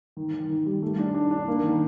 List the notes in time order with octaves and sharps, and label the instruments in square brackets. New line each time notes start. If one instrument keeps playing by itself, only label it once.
[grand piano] D#3
D#3
D#3
G3
A3
D4
D4
D4
A#3
D#3